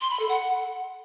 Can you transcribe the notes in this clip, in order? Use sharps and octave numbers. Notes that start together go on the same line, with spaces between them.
C6
B5
A4
F#5